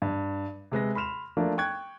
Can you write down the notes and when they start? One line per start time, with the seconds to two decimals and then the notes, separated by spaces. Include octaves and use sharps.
0.02 G2
0.72 C3 G#3 B4 A#6
0.95 B5 C6 F6 E7 F7
1.37 F3 A3 A#3 D4
1.58 G5 C#6 F#6 G#6